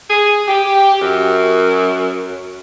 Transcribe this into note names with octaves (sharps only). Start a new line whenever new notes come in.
G#4
G4
F#2